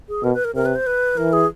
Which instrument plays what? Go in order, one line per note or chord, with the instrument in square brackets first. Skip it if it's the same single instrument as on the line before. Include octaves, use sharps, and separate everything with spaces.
[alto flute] G#4
[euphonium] B2 [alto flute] A#4
[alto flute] B4
A#4
[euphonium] C3 [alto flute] A#4
[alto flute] B4
C5
B4
[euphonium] E3 [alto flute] A#4
[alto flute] G#4